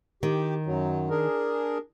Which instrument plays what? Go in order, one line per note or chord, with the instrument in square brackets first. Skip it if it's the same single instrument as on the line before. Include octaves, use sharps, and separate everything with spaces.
[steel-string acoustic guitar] D#3 [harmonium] G4
[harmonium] F#2 F#3
D4 G#4 A#4